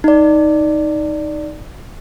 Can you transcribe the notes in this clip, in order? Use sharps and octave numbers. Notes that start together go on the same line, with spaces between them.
D#4 D5